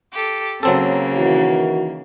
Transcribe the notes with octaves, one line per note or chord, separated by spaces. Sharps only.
G4 A4
C#3 F#3 A#3 C4 A4
D#3 E3 F#4